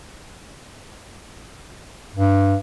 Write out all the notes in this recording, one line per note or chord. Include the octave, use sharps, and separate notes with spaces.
G2